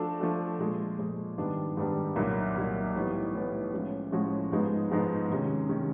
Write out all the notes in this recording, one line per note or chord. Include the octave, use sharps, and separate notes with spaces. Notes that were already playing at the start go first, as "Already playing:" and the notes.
Already playing: F3 A3 D4 F#4 A4
F3 A3 D4 F#4 A4
A#2 F3 G#3
A#2 F3 G#3
G#2 D#3 G3 B3 D4
G#2 D#3 G3 B3 D4
C2 A#2 F#3 A#3 D#4
C2 A#2 F#3 A#3 D#4
A2 E3 G3 B3 D#4
A2 E3 G3 B3 D#4
A2 F3 G#3 C#4 F#4
A2 F3 G#3 C#4 F#4
G#2 F3 G#3 B3 D#4
G#2 F3 G#3 B3 D#4
C3 D#3 G#3 C#4
C3 D#3 G#3 C#4